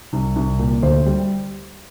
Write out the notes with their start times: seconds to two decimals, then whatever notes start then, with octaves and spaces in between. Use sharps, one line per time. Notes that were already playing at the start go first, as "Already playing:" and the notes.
0.13 C2
0.36 C2
0.59 A#2
0.82 D2 C5
1.06 G3